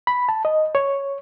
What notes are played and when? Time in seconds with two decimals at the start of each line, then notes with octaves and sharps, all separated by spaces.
0.07 B5
0.29 A5
0.45 D#5
0.75 C#5